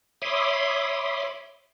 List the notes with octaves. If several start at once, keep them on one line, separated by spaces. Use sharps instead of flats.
C#5 E5 B5 C6 D6 D#6